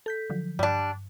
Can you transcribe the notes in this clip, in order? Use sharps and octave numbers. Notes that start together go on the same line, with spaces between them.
A4 G6 B6
D3 F3 F#3
G2 G3 D4